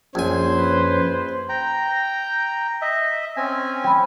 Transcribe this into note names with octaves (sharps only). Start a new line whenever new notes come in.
A#1 F#2 F3 C5 C#5 G#5
B4
G5 A#5
D#5 E5
C4 C#4 G#5
G5 B5